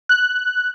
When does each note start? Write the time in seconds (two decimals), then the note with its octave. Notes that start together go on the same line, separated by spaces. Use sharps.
0.09 F#6